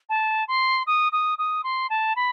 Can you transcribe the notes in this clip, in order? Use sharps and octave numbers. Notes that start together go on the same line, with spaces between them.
A5
C6
D#6
D#6
D#6
C6
A5
B5